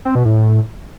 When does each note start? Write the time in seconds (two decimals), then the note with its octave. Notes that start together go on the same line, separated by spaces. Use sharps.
0.05 C4
0.15 B2
0.25 A2